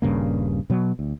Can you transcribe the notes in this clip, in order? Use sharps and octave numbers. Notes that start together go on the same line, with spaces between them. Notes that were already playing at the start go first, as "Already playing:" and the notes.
D#1 G2 C#3 A#3
B2 F#3
D2